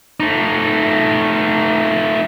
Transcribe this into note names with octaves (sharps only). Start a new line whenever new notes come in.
A3 D#4